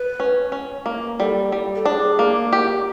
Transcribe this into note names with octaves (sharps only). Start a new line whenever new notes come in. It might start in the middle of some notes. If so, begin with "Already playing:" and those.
Already playing: B4
C#4
C#4
A#3
G3 A4
G3
A4
D4 G#4
A#3
G4